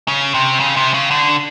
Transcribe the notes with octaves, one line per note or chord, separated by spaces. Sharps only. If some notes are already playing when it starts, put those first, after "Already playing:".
C#3
C3
C#3
C3
C#3
D3